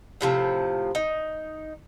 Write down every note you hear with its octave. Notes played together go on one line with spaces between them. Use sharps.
A2 C3 F3 A5
D#4